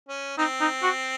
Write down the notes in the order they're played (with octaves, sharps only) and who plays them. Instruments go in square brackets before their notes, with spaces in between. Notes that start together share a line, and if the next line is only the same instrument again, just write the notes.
[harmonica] C#4
[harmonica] C4 [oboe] D#4
[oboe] D#4
F#4